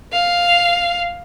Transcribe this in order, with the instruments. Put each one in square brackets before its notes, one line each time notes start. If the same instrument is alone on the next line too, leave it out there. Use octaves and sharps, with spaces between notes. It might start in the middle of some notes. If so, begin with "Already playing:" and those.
[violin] F5